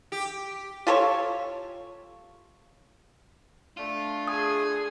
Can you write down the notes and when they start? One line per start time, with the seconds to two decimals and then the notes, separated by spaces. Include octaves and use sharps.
0.12 G4
0.87 F4 G4 A4 C#5
3.77 A3 D4 F4
4.28 G#4 G#5 D#6